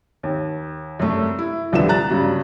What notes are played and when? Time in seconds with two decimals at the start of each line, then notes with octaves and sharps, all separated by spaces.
0.23 D#2
0.99 F#2 C3 G3 A3
1.39 E4
1.72 D#1 C2 D3 F3 B4 E7
1.89 A#5 F#6 A6
2.10 G2 C#3 F#3